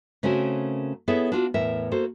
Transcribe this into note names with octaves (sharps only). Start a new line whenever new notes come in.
C#3 A3 C4 C#4 F#4 A#4
B3 E4 G#4 A4 C#5 E5
D4 F4 F#4
E2 A2 A#4 E5
A#3 F#4 A4 C5